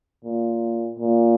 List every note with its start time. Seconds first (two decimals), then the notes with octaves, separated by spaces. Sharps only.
0.25 A#2
0.99 A#2